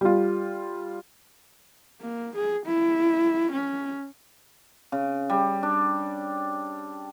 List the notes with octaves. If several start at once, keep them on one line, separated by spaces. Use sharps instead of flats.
G3 F4
A#3
G#4
E4
C#4
C#3
G3
D4